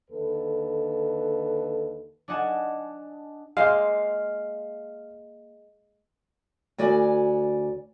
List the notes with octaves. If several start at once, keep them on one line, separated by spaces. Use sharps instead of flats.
D#2 D3 A4 B4
D4 D5 D#5 F#5 G#5 A5
G#3 A#3 C5 F5
D2 F#4 D5 G#5